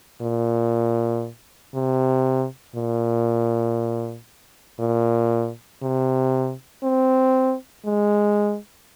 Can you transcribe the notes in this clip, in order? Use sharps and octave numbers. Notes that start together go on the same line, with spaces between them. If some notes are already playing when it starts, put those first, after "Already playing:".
A#2
C3
A#2
A#2
C3
C4
G#3